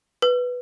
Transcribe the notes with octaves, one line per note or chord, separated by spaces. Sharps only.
B4